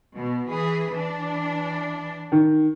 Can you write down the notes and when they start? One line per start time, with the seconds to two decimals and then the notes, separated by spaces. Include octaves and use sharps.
0.15 B2
0.48 E3 G#4 B4
0.92 E3 D4
2.32 D#3